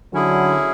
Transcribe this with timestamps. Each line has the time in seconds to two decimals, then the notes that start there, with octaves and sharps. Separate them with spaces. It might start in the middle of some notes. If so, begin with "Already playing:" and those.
0.14 D3 F#3 C#4 E4 G#4